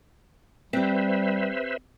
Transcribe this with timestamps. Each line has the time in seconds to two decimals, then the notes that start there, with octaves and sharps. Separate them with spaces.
0.73 G3 C4 G4 B4 C5 E5